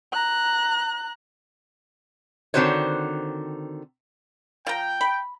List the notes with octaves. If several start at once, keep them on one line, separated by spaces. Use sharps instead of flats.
A#5 F#6
D3 D#3 C4 F#4 C5 C#5
F3 G5 A#5
B5